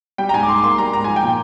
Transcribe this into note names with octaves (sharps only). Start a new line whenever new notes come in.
G3 G5
A#5
G#2 G#5
D6
G#2 C6
D6
A#3 C6
G3 A#5
G#2 A#5
F3 G#5
G5
A#2